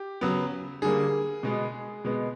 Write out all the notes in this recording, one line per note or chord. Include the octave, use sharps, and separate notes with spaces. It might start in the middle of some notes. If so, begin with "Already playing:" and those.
Already playing: G4
C#3 F#3 B3
D3 G3 A#3 G#4
B2 G#3 B3
B2 G#3 B3